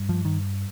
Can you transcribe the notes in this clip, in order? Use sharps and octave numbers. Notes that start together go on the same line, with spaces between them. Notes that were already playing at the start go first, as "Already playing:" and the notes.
Already playing: G2
F3
D#3